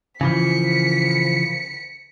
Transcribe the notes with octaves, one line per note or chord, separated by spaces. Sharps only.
C#3 E3 F3 B6 C#7